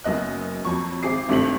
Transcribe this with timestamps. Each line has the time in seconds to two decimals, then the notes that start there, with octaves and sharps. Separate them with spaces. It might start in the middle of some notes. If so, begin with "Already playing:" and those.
0.04 F#1 F#2 B3 D#5 F#6
0.65 F2 F#3 C#6
1.03 G#1 C4 G4 G#4 D6 C7
1.29 G#1 G2 C3 A3 C4 F#7